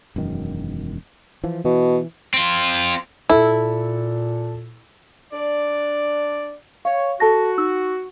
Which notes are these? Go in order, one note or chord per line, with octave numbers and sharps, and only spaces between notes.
E1 F#2 D#3
E3 F3
B2 E3
C4 F4
A#2 E4 A4
D4 D5
C#5 F5
F#4 A4 A5 A#6
D#4 E6